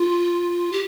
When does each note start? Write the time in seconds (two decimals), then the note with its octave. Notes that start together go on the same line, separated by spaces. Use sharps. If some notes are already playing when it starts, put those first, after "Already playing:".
Already playing: F4
0.72 G4